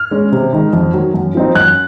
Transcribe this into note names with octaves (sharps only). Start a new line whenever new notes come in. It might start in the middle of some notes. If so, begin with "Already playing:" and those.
Already playing: F6
G#3 C#4
C3
D#3 G#3 D#4
F2
D#3 F#3
F#2
F3 C4 D#4
F#2 F#6